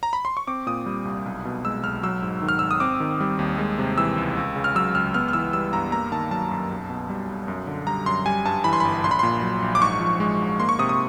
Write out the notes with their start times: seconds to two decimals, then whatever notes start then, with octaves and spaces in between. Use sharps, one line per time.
0.03 A#5
0.13 B5
0.25 C6
0.37 C#6
0.47 C4 D6
0.67 A#2 D#6
0.86 G3
1.05 C2
1.26 B1
1.45 B2
1.65 G#3 E6
1.83 B1 F6
2.03 F#3 E6
2.22 G#2
2.42 D#3
2.49 F6
2.59 G#1 E6
2.71 D#6
2.80 C4 D6
3.00 D#3
3.20 G3
3.39 D#2
3.58 G#3
3.78 C3
3.98 E3 E6
4.17 C#2
4.37 C#2
4.56 C#3
4.64 F6
4.75 F#3 E6
4.95 C#2 F6
5.14 B3 F6
5.28 F6
5.33 E3 E6
5.53 G3 E6
5.73 G2 A#5
5.92 A#3 A#5
6.12 D#3 A5
6.31 F#3 A5
6.51 F#2
6.71 B1
6.90 B2
7.09 G3
7.29 B1
7.48 F#2
7.67 D3
7.87 G3 A#5
8.06 F#2 C6
8.26 G3 G#5
8.45 G2 A5
8.64 E3 B5
8.73 C6
8.80 G1 B5
9.04 A#1 C6
9.11 B5
9.19 A#2 C6
9.42 F#3
9.62 A#1
9.75 D6
9.82 G#2 C#6
10.00 F3
10.20 G#3
10.40 G#2
10.60 A#3 C6
10.69 C#6
10.79 C3 D#6
10.89 D#6